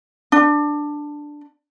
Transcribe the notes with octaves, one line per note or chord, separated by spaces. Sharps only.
D4